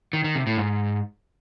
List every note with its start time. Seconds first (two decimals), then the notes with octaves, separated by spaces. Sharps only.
0.13 D#3
0.24 D#3
0.35 C3
0.47 A2
0.58 G#2